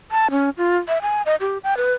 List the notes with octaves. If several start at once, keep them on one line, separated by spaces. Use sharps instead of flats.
A5
C#4
F4
E5
G#5
D#5
G4
G5
B4